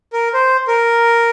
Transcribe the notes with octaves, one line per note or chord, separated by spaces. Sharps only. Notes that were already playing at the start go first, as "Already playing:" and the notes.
A#4
C5
A#4